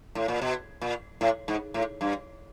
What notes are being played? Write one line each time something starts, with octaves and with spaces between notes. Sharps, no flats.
A2
A#2
B2
A#2
A2
G#2
A2
G2